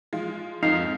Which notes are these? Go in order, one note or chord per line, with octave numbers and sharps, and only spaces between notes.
F3 G#3 F4
F2 G#2 D#4 F5